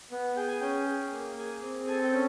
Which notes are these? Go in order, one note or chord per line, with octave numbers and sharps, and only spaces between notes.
B3
G#4 G5
G#5
C#4 G5
G#4
A#3
G#4 G#5
C4
A4 G#5
G5
C#4